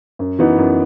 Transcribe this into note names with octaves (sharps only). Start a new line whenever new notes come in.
F#2
E3 B3 D#4 F#4
F#2